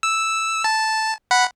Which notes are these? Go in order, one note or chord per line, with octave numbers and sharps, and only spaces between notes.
E6
A5
F#5 B5